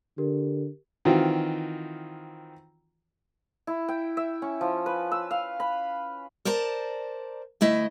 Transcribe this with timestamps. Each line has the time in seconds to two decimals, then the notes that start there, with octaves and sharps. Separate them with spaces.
0.18 D3 G4 A#4
1.05 D#3 E3 C4 F4 F#4
3.67 E4
3.89 G5
4.17 E5
4.42 C#4
4.61 F3
4.86 B4
5.12 E6
5.31 F5
5.60 B5
6.45 A#4 C5 D5 A5 A#5
7.61 D2 A3 E4 D#5